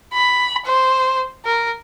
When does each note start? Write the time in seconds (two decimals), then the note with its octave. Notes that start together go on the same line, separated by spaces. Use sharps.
0.13 B5
0.65 C5
1.45 A#4